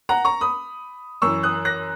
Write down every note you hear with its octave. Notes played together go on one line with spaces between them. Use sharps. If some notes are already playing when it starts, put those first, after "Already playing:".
F#5 A#5
A#5 C#6
B5 D#6
F#2 E3 C#6 E6
D#6 F#6
F#6 A#6